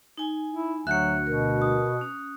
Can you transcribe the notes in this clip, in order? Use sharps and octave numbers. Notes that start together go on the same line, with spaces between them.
D#4 G#5
E4
D2 F#3 E5 F#5 F#6 G6 C#7
B2 A#4
D#6
C#4